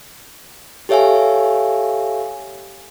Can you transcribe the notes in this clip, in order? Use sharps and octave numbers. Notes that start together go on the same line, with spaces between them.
G4 A4 C#5 E5 F5 G#5